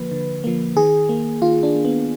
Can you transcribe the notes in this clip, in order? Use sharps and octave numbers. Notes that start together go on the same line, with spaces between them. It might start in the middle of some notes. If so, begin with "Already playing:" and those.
Already playing: D3 F3 A#3 B4
D3
F3 A#3
D#3 G#4
A#3
D#3 F4
D4
A#3
B3